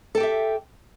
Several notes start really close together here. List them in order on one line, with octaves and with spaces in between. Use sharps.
A4 G5 G4 E5